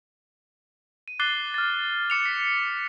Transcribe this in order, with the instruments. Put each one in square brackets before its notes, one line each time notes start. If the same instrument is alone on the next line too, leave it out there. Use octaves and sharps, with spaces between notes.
[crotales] D#7
D6 F#6 A6 C7 G7
F6 A6
D6 C#7 F7
B6